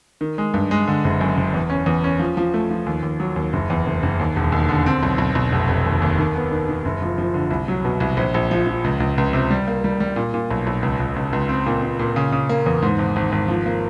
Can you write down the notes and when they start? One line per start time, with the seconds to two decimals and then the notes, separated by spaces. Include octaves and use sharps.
0.21 D#3
0.38 G#3
0.54 G2
0.71 G#3
0.87 D3
1.04 F#1
1.21 F#2
1.37 F#1
1.54 E2
1.70 C#4
1.86 E2
2.04 C#4
2.19 F3
2.37 F3
2.54 A3
2.70 F3
2.86 D#2
3.02 D#2
3.20 F#3
3.36 D#2
3.53 F#1
3.70 E2
3.86 F#1
4.03 F#1
4.19 D#2
4.36 E1
4.52 D#2
4.69 D3
4.86 C4
5.03 B1
5.18 B1
5.35 B1
5.52 F1
5.68 F1
5.86 D#2
6.02 D#2
6.18 D#3
6.36 B3
6.51 D#3
6.69 D#3
6.85 F#1
7.02 F3
7.18 F3
7.34 D3
7.51 C2
7.68 F#3
7.85 B2
8.00 C2
8.17 A#1
8.34 A#1
8.51 F3
8.67 F3
8.84 C#2
9.00 C#2
9.18 C#2
9.33 C3
9.50 G3
9.68 A#3
9.84 G3
10.00 G3
10.16 A#2
10.34 A#2
10.51 B1
10.67 B1
10.83 C#2
11.00 C#2
11.16 C#2
11.33 C#2
11.49 C4
11.66 A#2
11.83 A#2
11.99 A#2
12.16 C#3
12.32 C#3
12.49 A#3
12.66 E2
12.82 G#2
12.99 G#1
13.16 G#1
13.32 G#1
13.48 F3
13.66 A#3